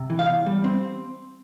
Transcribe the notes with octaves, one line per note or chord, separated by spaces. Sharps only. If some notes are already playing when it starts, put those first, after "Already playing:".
Already playing: C3
E3
F5
E2
G3
C4